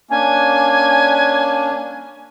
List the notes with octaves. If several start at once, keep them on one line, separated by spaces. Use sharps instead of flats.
A#3 C#4 D4 G#5